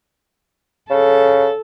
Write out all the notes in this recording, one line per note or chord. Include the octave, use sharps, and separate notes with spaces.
C#3 A4